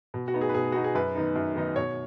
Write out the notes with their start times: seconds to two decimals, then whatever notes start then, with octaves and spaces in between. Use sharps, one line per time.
0.14 B2
0.28 F#4
0.34 B3 D#4
0.41 G#4
0.49 B4
0.54 B2 G#4
0.72 B3 D#4 F#4
0.84 G#4
0.95 F#2 B4
1.15 D#3 B3 D#4
1.36 F#2
1.56 D#3 B3 D#4
1.76 B2 C#5